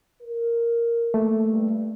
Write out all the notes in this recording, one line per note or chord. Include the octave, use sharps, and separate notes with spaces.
A#4
A3 A#3
G2